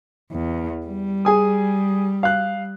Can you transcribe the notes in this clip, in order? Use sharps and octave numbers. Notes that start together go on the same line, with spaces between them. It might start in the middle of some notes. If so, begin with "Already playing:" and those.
E2
G3
G#4 G#5 D#6
F5 F#6